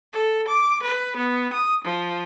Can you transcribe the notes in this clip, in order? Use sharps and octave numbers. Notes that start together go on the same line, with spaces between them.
A4
D6
B4
B3
D#6
F3